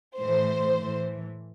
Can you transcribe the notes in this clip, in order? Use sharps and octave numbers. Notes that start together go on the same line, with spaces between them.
A2 E3 C5
A2 E3